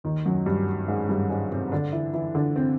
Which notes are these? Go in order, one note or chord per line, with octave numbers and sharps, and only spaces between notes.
D#2 D#3
F#2 F#3
G2 G3
G#2 G#3
G2 G3
G#2 G#3
C3 C4
D3 D4
E3 E4
E3 E4
D3 D4
C3 C4